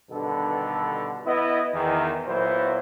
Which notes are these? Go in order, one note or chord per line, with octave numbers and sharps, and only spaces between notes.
G2 B2 D3 D#3 B3 A4
B3 E4 D#5
E2 D#3
A#2 F#3 B3 E4 F#4 C5